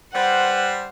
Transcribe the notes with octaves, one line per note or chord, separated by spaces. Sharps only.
G3 B4 C5 F#5